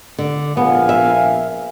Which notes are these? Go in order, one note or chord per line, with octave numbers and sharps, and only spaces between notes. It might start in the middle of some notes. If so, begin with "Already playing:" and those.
D3
A#1 B3 F5 G#5
E5